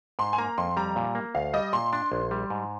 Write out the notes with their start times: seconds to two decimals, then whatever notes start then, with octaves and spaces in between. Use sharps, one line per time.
0.19 G#2 C6
0.33 G#5
0.38 A#3 A#5
0.58 F2 C6
0.77 G3 A#5
0.96 A#2
1.15 A#3
1.35 D2 F5
1.54 G3 D#5
1.73 A#2 C6
1.93 D4 C6
2.12 A#1
2.31 G3
2.50 G#2